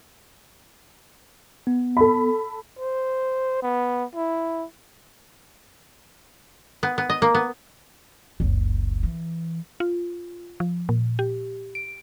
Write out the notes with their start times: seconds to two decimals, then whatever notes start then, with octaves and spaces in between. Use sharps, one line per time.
1.67 B3
1.97 A4 B5
2.79 C5
3.62 B3
4.16 E4
6.83 B3
6.98 B3
7.10 D#5
7.22 A#3
7.35 B3
8.40 F#1 C#2
9.03 E3
9.80 F4
10.60 F3
10.89 A#2
11.19 G4
11.75 D7